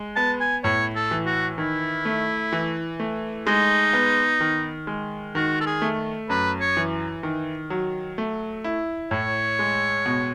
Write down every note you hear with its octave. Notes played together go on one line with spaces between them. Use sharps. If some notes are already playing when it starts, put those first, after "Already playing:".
Already playing: G#3
B3 A5
G#5
A2 C#5
A4
E3
F#4
D#3 E4
A3
E3
A3
G#3 D#4
B3
D#3
G#3
D#3 F#4
A4
G#4
A3
F#2 B4
C#5
E3
D#3
F#3
A3
E4
A2 C#5
G#3
B2